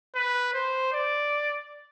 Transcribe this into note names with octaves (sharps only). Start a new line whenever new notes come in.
B4
C5
D5